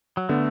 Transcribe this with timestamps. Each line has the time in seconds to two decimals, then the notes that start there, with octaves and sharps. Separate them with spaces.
0.17 F#3
0.29 D3 A3 B3